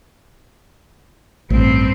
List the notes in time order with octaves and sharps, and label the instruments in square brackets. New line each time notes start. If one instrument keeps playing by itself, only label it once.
[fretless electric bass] A1 [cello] G2 C4